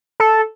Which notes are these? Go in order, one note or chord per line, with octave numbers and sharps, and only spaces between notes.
A4